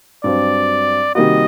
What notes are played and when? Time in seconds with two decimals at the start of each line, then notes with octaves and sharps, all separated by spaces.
0.24 G2 F#3 C4 D5
1.15 C3 D#3 G3 A#3 F#4 D#5